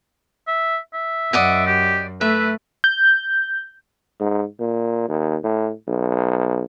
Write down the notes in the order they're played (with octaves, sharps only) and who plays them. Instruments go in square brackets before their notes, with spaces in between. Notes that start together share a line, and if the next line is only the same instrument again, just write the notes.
[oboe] E5
E5
[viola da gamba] F#2 [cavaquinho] D5 D#5 F#5
[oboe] G4
[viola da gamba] A3 [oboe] B4 [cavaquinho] E5
[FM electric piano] G6
[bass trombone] G#2
A#2
D#2
A2
B1